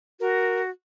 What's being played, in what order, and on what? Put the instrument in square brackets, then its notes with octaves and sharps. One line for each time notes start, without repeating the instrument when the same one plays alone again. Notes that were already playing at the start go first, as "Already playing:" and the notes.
[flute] F#4 [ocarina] A#4